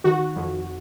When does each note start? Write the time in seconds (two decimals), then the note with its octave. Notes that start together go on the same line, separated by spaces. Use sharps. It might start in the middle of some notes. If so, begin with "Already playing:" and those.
0.04 D#3 F#4
0.36 F2